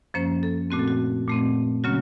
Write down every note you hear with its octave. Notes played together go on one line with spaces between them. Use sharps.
F#2 F3 A#3 C#4 C5
A4
A#2 A3 C4 F#4
A4
F#4
A#2 A3 C4
C#3 F#3 A#3 C#4 F#4